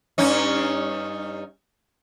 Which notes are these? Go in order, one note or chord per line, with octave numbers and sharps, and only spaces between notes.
G2 C#4 D#4